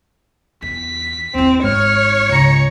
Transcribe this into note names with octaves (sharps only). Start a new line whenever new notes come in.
E2 B6
D#2 C4 E4
G#1 G#2 C#5 F6
C#2 C#3 A#5 C#7